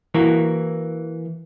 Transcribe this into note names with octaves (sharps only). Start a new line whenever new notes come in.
E3 A#3 F#4